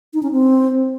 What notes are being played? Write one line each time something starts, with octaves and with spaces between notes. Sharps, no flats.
D#4
C#4
C4